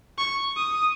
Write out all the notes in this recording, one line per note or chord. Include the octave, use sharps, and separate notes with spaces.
C#6
D#6